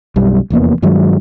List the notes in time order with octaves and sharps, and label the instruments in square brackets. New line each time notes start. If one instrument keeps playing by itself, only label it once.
[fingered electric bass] B1 F#2 G3
F1 E2 A#3 B3
G2 D#3 F#3 G#3